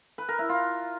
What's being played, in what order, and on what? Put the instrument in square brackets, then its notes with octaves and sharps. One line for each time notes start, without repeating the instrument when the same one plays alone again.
[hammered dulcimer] B4
A#4
E4
F4